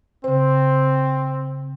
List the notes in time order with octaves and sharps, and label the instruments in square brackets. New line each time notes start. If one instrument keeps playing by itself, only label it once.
[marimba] C#3 C5 [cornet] C4